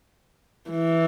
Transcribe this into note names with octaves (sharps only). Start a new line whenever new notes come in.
E3